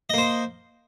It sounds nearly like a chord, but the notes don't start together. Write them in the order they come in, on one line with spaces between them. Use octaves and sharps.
D#5 A#3 C5